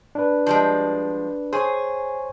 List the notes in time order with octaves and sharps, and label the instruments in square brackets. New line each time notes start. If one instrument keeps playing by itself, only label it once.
[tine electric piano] D4 B4
[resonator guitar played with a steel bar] F3 G3 G#3
[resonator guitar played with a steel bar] G#4 [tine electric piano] C5 C#5 G#5